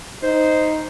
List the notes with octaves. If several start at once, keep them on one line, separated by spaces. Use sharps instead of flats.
D#4 C5